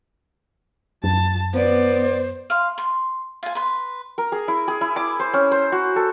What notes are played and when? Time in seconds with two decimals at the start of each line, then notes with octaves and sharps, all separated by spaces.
1.04 F#2 A5
1.53 B3 C5 D5
2.50 F5 C6
2.78 C6
3.43 F4 G#5
3.55 B4 C6
4.18 A#4
4.32 G#4
4.48 E4
4.68 G#4
4.81 E4
4.96 D6
5.20 C5
5.33 C#4
5.51 C5
5.72 F#4
5.96 A4